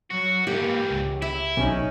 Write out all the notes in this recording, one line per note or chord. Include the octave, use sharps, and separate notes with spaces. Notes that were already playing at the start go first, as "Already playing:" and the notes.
F#3 F#4
G#2 E3 A#3 G4
C#2
E4 E5
B1 C#4 D#4